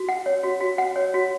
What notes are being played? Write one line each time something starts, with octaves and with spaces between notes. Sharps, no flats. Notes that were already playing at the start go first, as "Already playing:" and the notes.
Already playing: F#4
F#5
C#5
F#4
F#4
F#5
C#5
F#4